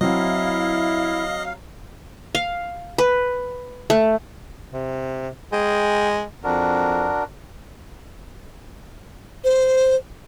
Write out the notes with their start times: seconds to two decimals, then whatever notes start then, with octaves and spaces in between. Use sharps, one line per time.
0.01 F#3 C4 E4 D#5 F5
2.35 F5
2.98 B4
3.90 A3
4.73 C3
5.52 G#3 G#4 G5
6.44 F2 D4 F#4 A#4
9.44 C5